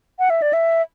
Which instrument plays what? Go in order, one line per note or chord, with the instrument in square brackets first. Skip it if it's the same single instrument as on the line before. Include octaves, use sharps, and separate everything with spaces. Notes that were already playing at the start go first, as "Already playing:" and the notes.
[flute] F#5
E5
D5
E5